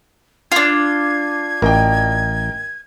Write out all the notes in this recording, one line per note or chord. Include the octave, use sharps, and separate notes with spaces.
D4 F4 G#6
A1 A#4 D#5 G5